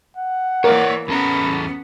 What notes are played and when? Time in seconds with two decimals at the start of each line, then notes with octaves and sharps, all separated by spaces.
0.17 F#5
0.64 E3 A#3 A#4 C#5 D5
1.08 E2 B3 C#4 A4 A#5 B5